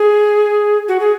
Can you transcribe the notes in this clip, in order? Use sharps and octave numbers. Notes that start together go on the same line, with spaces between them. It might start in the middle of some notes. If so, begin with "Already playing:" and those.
Already playing: G#4
F#4
G#4